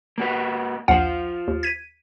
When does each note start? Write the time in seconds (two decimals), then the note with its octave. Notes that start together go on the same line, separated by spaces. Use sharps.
0.18 A#3 F#4 B4
0.88 A#1 D#2 F4 C5 F#5
1.48 D#2
1.63 G#6 B6 D#7